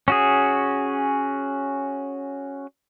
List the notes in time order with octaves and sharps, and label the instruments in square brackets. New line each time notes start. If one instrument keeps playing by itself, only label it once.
[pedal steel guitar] C#4 F#4 G#4